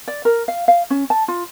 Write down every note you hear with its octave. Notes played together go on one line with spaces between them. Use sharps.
D5
A#4
F5
F5
C#4
A5
F4